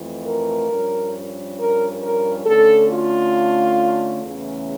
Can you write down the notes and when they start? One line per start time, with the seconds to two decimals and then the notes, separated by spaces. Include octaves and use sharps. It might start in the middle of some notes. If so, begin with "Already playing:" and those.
Already playing: F2 E3 A3
0.23 A#4
0.68 G2 F3 C#4
1.57 A#4
2.01 A#4
2.45 D3 A3 C#4 A4
2.89 F4
4.23 E2 C#3 E3 A3 C#4